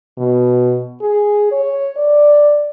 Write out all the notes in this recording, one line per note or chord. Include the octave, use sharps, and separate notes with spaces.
B2
G#4
C#5
D5